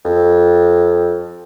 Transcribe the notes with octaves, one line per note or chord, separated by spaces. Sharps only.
F2